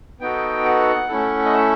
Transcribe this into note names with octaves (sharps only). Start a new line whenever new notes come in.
B3 D#4 F#4 A4 G5
F#5
A3 C#4 E4 A4
D#5
E5